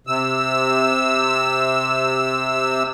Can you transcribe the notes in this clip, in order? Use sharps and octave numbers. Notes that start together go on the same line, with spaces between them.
C3 E6